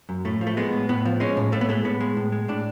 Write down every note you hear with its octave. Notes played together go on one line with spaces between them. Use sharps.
F#2
A2 A3
F3
A3
G#3 B3
A2
A2 B3
F3
G#3 C#4
A2
A2 A3
B3
G#3 A3
A2 B3
G#3
A2
G#3
A2 D4